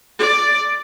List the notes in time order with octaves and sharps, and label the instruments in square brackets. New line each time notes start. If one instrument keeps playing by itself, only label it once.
[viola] D5